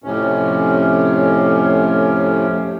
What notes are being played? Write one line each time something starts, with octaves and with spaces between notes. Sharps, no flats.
F2 A2 C3 C#4